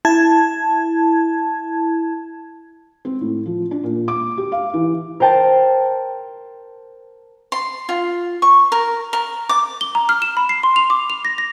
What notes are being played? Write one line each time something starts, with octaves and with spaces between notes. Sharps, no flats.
E4 A5 G#6
C4
A2
F3
D4
A#2
D6
G4
F5
E3
A#4 C5 G5 A5
C6
F4
C#6
A#4
A#4
D6
G7
A#5
F6
E7
B5
C7
C6
F7
D6
F7
A#6
A#6